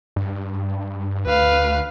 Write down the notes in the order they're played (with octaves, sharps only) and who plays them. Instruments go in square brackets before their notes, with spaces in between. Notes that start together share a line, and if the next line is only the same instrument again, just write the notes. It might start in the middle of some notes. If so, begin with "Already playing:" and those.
[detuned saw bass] G2
[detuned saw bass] D2 [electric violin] B4 F5